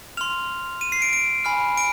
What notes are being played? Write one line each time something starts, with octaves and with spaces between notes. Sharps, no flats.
C6 F6 F7
D#7
C7
D7
D7
G#5 B5 F6
D7